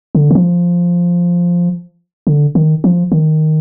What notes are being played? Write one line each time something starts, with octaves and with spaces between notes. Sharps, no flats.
D3
D#3
F3
D3
D#3
F3
D#3